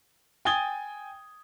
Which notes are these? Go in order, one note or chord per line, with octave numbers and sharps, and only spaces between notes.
G5 G#5 D#6 G#6 A6 G7